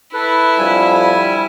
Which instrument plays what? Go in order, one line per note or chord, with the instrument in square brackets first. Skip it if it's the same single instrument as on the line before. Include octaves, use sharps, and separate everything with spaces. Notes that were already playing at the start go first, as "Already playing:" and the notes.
[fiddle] E4 [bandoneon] A4 B4
[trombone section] F2 D3 F3 [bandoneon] G3 G#5